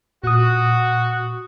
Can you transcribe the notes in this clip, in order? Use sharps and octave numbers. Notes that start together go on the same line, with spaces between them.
A#2 F#4 D#6